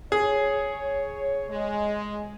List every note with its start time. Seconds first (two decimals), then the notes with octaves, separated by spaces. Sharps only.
0.12 G#4 C#5
1.50 G#3